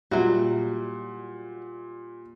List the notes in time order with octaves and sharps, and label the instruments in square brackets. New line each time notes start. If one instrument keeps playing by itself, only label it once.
[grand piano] A#2 G3 [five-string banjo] F#3 E4 F#4